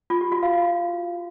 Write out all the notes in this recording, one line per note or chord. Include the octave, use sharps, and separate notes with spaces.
F4
G4
F#4
F5